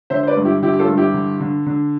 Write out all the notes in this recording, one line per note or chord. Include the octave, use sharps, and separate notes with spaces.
D3 C5 E5
C5
B4 D5
G2
E4 G4
D3 E4 G4
G4
F4 A4
G2
E4 G4
D3
D3
D3